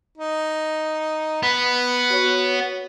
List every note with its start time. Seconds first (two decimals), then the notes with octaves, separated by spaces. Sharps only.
0.18 D#4
1.43 B3 B4
2.11 F#4 C#5